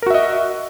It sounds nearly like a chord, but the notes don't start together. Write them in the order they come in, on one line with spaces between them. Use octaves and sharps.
A#4 F#4 E5 D#5